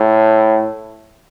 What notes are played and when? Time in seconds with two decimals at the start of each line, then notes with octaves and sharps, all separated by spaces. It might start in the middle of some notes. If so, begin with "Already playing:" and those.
Already playing: A2